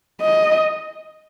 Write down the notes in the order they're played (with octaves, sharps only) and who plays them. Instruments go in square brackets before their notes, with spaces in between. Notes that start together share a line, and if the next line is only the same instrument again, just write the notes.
[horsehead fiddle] D#5